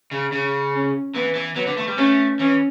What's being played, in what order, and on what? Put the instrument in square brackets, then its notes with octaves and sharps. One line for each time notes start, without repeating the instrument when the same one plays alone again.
[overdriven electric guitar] C#3
C#3
[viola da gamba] C#4
[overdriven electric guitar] E3 [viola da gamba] B3
[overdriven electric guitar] E3
[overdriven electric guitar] F#3 [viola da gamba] B3
[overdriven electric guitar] D3
A3
G3
[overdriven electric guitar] A3 [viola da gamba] C#4
[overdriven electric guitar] E3 [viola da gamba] C#4